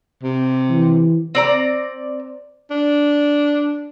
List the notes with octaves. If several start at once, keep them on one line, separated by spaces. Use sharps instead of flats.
C3
E3
C4 D5 A#5
D4